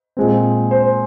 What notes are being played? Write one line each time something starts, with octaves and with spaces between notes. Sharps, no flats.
A#2 G#3 C4
C5